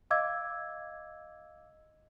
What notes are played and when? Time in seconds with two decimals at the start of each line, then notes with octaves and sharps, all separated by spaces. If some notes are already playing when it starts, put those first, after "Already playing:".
0.11 D#5 F5 D6 E6 G#6